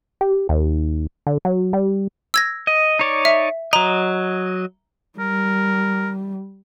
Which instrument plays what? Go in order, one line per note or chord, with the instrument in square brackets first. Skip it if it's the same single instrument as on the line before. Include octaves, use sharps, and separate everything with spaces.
[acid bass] G4
D#2
D3
F#3
G3
[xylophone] E6 G#6 A#6
[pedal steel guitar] D#5
D#4 C#5 D5
[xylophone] E5
[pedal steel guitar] F#3 D#5 [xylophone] A#5
[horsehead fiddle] G3 [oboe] A#4